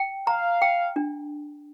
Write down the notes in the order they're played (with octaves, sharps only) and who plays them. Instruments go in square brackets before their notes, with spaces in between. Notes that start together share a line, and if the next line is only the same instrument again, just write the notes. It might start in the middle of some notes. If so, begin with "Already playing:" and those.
Already playing: [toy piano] G5
[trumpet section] F5 [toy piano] A#5
[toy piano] G5
D4